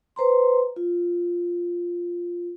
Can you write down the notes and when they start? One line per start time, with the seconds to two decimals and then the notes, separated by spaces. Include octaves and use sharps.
0.16 B4 C5 A#5 C6
0.76 F4